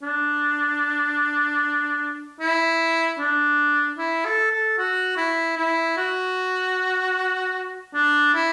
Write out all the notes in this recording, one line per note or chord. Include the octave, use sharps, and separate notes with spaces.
D4
E4
D4
E4
A4
A4
F#4
E4
E4
F#4
D4
E4